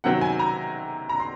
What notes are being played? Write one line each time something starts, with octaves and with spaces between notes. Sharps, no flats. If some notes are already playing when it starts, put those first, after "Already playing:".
C3 D#3 F#3 C4 F#5
G#5
A#5
A#5
C6